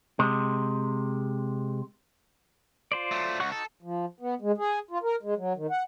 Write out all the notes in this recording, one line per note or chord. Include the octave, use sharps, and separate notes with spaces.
C3 G#3
F4 C5 D5
F#3 A3
C#2 F#5 C#6 F#6
D#4 F#4 A4
F3
B3
G#3
G#4
F4
A#4
G#3
F#3
D#3
F#5